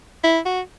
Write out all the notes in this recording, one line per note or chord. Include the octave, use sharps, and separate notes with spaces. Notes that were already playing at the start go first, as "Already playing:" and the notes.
E4
F#4